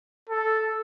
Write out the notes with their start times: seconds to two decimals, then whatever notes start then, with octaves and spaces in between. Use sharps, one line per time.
0.30 A4